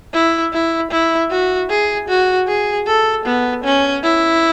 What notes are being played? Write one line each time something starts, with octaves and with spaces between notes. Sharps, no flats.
E4
E4
E4
F#4
G#4
F#4
G#4
A4
B3
C#4
E4